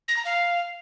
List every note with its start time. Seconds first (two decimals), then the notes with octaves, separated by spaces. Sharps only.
0.08 A#6
0.16 A#5
0.25 F5